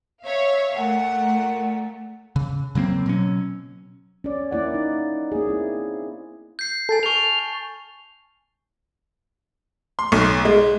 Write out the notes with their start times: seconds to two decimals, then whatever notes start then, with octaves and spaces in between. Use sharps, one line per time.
0.24 C#5 E5 F5
0.76 A#2 A3 F#5
2.36 C#3
2.75 C#3 F#3 A#3 C4
3.06 B2 F#3 C#4
4.24 C#4 D5
4.51 A#3 E4 D5 F#5
4.75 D#4
5.32 A#3 G#4
5.47 A#3 C4 E4
6.59 G6 C7
6.89 A4 G#5 A6 C7
7.03 A5 C#6 F6
9.99 C6
10.12 B1
10.45 G#3